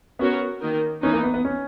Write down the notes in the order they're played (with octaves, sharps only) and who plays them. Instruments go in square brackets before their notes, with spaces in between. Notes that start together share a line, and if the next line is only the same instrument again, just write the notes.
[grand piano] B3 [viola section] C#4 F#4 A#4 C#5
[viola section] D#3 A#3 D#4 A#4
[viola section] E3 B3 D#4 [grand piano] C#4
[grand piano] A#3
B3
B3
C#4